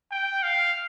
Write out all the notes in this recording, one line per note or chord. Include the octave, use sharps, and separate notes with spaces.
G5
F5